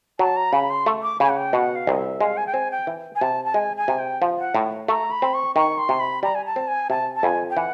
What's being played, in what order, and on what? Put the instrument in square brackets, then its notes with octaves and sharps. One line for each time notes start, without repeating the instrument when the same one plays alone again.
[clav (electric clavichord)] F#3 [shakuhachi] A5
[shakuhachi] A#5
[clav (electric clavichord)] C#3 [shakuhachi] B5
[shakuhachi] C6
[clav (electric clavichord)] A3
[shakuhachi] D6
[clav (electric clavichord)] C#3 [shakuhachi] G#5
[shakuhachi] F#5
G5
[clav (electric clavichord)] B2 [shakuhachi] F#5
[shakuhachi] F5
[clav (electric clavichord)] C2 [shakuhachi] D#5
[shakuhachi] E5
[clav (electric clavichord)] G#3 [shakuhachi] F5
[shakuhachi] G#5
G5
[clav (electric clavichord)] C4 [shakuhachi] G#5
[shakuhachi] G5
[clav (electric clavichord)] E3
[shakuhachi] G#5
[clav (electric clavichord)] C3 [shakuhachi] A5
[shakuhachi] A5
[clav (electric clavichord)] G#3 [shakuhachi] G#5
[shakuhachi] G#5
[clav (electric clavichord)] C3
[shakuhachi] G5
[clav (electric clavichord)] F3
[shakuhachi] F#5
[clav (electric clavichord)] A2
[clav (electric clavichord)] A3 [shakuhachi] A#5
[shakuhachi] B5
[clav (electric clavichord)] C4
[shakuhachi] C#6
[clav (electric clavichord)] D#3 [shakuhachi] C#6
[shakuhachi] C6
[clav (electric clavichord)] C3
[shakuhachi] B5
[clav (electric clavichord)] G3 [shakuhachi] A#5
[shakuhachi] G#5
A5
[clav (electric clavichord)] C4
[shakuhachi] G#5
[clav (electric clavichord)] C3 [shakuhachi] A5
[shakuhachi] A5
[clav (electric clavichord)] F2 [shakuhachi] G#5
[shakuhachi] G5
[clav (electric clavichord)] E3 [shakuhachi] F#5